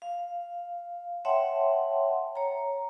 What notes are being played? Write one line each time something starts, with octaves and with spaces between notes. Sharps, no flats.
F5
C#5 E5 F#5 G5 A5 C6
C#5 A#5